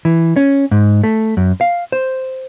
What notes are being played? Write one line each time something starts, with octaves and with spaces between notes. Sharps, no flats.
E3
C#4
G#2
A3
F#2
F5
C5